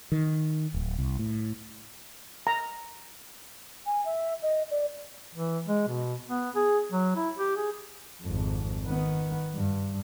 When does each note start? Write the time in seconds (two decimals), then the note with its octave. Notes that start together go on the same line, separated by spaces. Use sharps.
0.12 D#3
0.74 D1
0.98 C2
1.19 A2
2.47 A#5
3.86 G#5
4.06 E5
4.42 D#5
4.71 D5
5.35 E3
5.68 G#3
5.88 B2
6.28 B3
6.56 G#4
6.92 F#3
7.16 E4
7.38 G4
7.56 G#4
8.21 G#1 F2
8.84 D#3 B3
9.54 G2